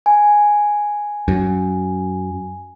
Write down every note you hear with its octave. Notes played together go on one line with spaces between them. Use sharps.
G#5
F#2